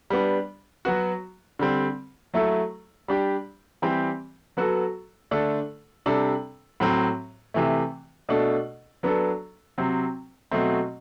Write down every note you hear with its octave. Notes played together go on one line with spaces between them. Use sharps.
G3 B3 D4
F#3 B3 F#4
D3 G3 C4
F#3 A3 E4 A4
G3 D4 G4
E3 G3 C4 G4
F#3 B3 F#4 A4
D3 A3 D4 A4
C3 G3 D4 A4
A2 F#3 C4
C3 E3 A3
B2 A3 D4 A4
F#3 B3 D4 A4
C3 F#3 C4
B2 F#3 A3 C4